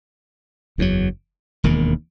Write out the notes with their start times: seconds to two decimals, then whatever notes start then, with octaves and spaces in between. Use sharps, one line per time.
0.78 F#1 E2 C#3 F#3
1.64 E1 D#2 D#3